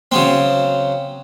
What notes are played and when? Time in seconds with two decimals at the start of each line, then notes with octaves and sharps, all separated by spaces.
0.12 C#3 F#3 C4